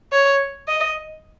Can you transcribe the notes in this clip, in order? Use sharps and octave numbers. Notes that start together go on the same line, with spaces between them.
C#5
D#5